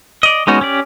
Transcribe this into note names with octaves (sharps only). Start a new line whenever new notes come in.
D5 D#5
G#3 B3 C#4 D#4 F#4
C#4 G4 D5